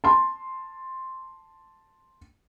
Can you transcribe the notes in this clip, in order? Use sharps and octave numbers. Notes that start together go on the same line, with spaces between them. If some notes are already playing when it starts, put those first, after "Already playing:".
A5 C6